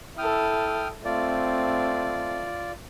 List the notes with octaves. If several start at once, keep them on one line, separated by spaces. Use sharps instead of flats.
E4 A4 G5 D#6 F6
A3 C4 F4 D5